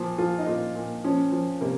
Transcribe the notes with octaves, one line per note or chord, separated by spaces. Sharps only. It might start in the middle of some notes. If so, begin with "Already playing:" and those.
Already playing: A#2 F3
F3 F4
D#4
A#2 F4
A#2
F3 C#4
F3
C3 A#3